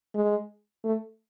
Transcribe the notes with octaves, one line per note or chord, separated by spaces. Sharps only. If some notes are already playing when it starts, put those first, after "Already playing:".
G#3
A3